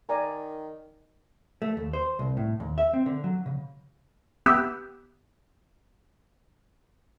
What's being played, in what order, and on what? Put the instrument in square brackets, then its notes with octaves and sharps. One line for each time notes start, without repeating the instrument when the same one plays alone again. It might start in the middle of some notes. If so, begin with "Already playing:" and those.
[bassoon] D#3 [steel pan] D5 G#5 A#5
[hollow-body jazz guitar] A3
D#2
C5
C2
A2
D#2
E5
C4
D3
F#3
C#3
[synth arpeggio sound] B3 G4 E5